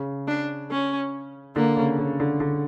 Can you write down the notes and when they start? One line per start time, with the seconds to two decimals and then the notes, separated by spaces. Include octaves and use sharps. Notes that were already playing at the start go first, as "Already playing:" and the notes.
Already playing: C#3
0.28 D4
0.71 C#4
1.56 D3 A#3
1.77 C#3
1.99 C#3
2.20 D3
2.40 D3